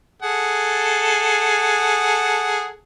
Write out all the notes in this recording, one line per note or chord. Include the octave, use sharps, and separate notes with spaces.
G#4 A4 F#5